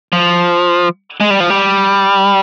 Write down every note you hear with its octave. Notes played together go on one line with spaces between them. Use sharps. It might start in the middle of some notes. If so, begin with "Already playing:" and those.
F3
G#3
G3
F3
G3